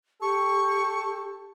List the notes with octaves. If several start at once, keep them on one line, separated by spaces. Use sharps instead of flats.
G4 A4 C#6